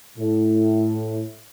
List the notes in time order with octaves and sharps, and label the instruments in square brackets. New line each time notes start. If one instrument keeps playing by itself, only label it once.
[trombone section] A2